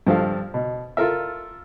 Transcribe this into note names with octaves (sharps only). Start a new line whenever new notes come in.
G2 F3 A4 F5
B2
F4 A4 A#4 E5